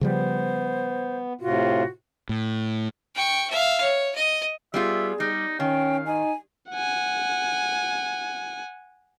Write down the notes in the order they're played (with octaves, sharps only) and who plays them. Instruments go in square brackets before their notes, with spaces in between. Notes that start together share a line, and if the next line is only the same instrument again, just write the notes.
[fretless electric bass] C#3 F3 G3 [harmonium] B3 [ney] C5
[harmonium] A2 C3 F4 [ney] F#4
[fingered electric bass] A2
[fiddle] G5 C#6
E5 F5
C#5
D#5
[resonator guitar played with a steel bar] G3 B3 F4 [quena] G#4 [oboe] E5
[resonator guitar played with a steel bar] G3 [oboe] D#4
[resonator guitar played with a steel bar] D#3 [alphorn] C#4 [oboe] F5 [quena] G5
[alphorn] D#4 [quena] G#5
[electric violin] F#5 G#5